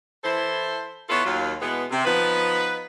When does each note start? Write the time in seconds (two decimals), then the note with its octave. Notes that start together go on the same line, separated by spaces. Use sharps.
0.24 E3 E4 A4 C5
1.09 B3 E4 F4 A4 B4 C#5
1.25 D#2 F#3 F4
1.61 B2 E3 G#3 B3
1.91 C3
2.05 F3 B3 D#4 B4